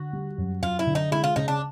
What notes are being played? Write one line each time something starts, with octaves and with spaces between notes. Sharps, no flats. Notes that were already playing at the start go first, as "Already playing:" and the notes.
Already playing: D3 F#4
G3
F#2
F#2 F4
E4
D3
D#4
G#3 E4
F4
C#3 D#4
D4